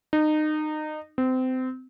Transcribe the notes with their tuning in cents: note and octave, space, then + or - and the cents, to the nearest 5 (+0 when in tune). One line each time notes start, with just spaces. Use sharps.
D#4 -25
C4 -25